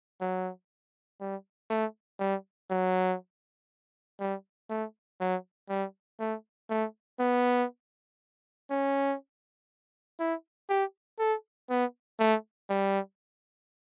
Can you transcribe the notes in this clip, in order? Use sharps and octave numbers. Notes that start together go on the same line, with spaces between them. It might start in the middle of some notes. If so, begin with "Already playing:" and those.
F#3
G3
A3
G3
F#3
G3
A3
F#3
G3
A3
A3
B3
C#4
E4
G4
A4
B3
A3
G3